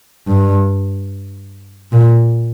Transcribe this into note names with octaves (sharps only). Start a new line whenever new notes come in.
G2
A#2